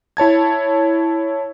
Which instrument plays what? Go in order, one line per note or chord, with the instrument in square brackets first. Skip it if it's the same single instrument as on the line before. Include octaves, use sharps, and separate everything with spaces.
[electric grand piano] E4 C#5 A5 G#6